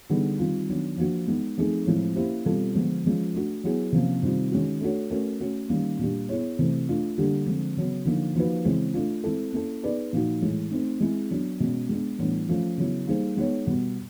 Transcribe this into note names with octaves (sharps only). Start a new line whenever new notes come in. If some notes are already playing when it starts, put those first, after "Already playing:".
D3 G3 B3 D#4 G#4
D#3 G3 C4 F4
D#3 F#3 B3 D4
F3 A#3 D4 F#4
G#3 B3 D#4
F3 A3 C4 D#4 G#4
A2 F3 G#3 C4 E4
A#3 C#4 E4 G4 C5
B2 G3 C4 F4 A4
D3 F3 G#3 B3
F3 G#3 C#4 F4
A3 D4 F#4
F#3 B3 E4 G#4
C3 F3 A#3 C#4
C3 D#3 G3 C4 F4
D#3 G#3 C#4 F#4
A3 D4 F#4 A4 C#5
A3 C#4 F#4 A#4
A3 C#4 F#4
D#3 G3 A#3 C#4
A#2 G3 A#3 D4 G4
B3 E4 G#4 C#5
C3 E3 A3
A3 D4 F4
D3 G3 A#3 D4 G4
D3 F3 G#3 C4
C#3 F#3 B3
D3 F3 A#3 D#4
F3 A#3 D#4 F#4 B4
C#3 E3 G#3 C4
A3 D4 F4
G#3 C4 E4 A4
A#3 C#4 E4 A4
B3 D#4 G#4 B4 D5
A#2 F3 A#3 D#4 F#4
A2 E3 G#3
A3 C4 D#4
G#3 C4 E4 G#4
F#3 B3 D4
B2 G#3 C#4
G#3 B3 D4
A2 E3 G3 B3 D4
F3 A3 C#4 F4
C#3 F#3 B3 E4
G3 A#3 D#4 G#4 C5
G#3 B3 D#4 G#4 C#5
B2 G3 B3